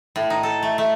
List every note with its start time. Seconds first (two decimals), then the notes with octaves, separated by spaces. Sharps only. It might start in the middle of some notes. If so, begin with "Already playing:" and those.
0.16 A2
0.30 D#4
0.43 A4
0.63 A3
0.78 A3